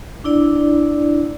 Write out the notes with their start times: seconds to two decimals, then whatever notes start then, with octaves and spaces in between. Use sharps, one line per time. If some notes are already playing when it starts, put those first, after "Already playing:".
0.24 D4 E4 D5